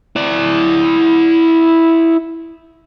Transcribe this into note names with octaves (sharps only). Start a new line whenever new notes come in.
E4 D5